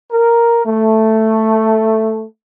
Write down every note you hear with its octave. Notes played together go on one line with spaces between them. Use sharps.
A#4
A3